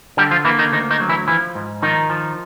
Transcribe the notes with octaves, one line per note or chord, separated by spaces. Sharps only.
D3 G3 G4
F3 F4
E3 A#3 E4
D#3 D#4
D2 D#3 D#4
D#3 D#4
F#3
E3 E4
E3 F3 E4
G#2
D#3 F3 D#4
F3